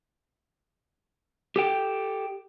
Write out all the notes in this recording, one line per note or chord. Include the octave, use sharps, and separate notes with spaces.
G4 A4 G5